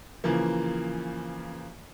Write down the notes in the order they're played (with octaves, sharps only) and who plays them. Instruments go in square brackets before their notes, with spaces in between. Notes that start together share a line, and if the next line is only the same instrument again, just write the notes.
[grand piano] C#3 E3 F3 A#3